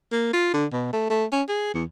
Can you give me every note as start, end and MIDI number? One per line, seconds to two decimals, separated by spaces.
0.12 0.29 58
0.33 0.52 65
0.54 0.66 50
0.72 0.89 47
0.93 1.08 57
1.10 1.24 57
1.32 1.42 61
1.48 1.70 68
1.74 1.84 40